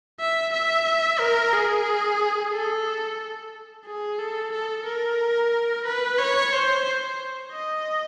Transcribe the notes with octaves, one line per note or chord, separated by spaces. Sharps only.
E5
E5
A#4
G#4
A4
G#4
A4
A4
A#4
B4
C#5
C5
D#5